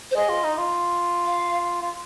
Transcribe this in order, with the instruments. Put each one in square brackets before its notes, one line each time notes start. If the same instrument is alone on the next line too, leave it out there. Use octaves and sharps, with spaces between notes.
[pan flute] C5
[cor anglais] G#4 [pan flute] D#5
[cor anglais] F4
D#4
F4
[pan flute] F5
[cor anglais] F4